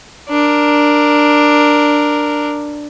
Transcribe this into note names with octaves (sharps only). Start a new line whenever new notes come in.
D4 A#4